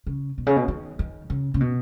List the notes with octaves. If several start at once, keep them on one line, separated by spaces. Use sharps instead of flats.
C#3
B2
C#3
B2
D#3
D#3
C#3
C#3
B2